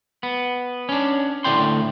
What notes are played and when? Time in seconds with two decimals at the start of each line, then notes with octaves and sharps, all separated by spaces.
0.23 B3
0.89 C#4 D4
1.44 D2 A2 C3 D5 G5 C6